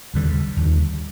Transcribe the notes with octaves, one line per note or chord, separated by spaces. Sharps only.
D#2 D3 G3
D#2 D3 G3